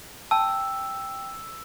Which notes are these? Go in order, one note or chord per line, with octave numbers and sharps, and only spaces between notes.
G5 A5 E6